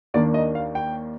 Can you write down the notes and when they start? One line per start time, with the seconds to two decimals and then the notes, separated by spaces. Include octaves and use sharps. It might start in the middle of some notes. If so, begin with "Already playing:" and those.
0.14 D#2 D#3 A#3 D4 D5
0.34 D#5
0.55 F5
0.75 G5